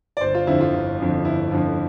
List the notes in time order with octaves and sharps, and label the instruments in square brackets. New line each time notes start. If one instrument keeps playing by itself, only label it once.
[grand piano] D5
G1 C5
F4
F2 D3 F3 E4
F4
G1
F2 D3 F3
G1 E4
F2 D3 F3